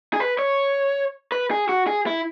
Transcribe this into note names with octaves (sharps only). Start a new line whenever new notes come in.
G#4
B4
C#5
B4
G#4
F#4
G#4
E4